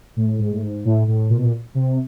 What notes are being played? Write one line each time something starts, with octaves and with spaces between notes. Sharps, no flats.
A2
G#2
A2
G#2
A2
A2
A#2
B2
A#2
C3